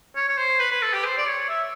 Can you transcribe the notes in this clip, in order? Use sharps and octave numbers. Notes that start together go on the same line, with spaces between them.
C#5
C#5
C5
B4
B4
A4
G4
C5
D5
C#5
E5